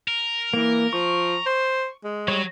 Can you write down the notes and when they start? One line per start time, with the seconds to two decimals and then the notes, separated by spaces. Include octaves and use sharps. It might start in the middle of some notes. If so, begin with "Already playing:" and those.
0.08 A#4
0.54 E3 A#3
0.93 F3 C#6
1.46 C5
2.04 G#3
2.28 F#3 G3 C#5